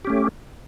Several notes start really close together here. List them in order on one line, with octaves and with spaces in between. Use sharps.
G4 C#4 A3